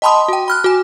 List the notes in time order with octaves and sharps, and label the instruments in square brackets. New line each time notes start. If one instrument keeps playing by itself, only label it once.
[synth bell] D#5 G5 A5 B5 C6 D#6
F#4 G5
B5 F6 F#6
F#4 G#5